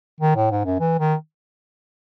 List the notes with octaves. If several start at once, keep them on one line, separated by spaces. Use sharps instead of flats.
D#3
A2
G#2
F#2
E3
D#3